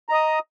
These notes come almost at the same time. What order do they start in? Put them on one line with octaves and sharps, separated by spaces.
A#5 D#5 D#6